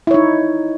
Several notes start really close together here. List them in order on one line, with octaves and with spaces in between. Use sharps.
E4 C#5 D#4